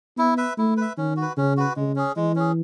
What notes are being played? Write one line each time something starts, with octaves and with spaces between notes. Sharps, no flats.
B3 E4
B4 E5
A3 E4
B4 E5
D#3 C#4
F#4
B4
C#3 C#4
F#4 B4
C#3 G#3
C#4 G#4
E3 G#3
C#4 G#4